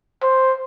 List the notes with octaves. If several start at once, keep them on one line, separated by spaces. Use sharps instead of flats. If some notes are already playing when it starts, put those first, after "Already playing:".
C5